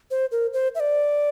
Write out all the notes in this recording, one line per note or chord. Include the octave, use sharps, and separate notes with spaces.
C5
A#4
C5
E5
D5